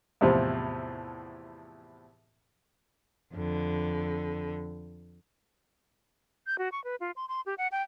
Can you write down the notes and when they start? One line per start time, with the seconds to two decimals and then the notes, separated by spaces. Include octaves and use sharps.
0.21 E2 A2 C3 F3
3.34 F2 D3
6.47 G6
6.58 F#4
6.72 C#6
6.84 B4
7.00 F4
7.16 C6
7.29 C6
7.46 G4
7.58 F#5
7.72 G5